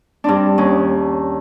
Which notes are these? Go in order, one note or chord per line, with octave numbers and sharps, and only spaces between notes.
G2 C4 D4
D#2 C#4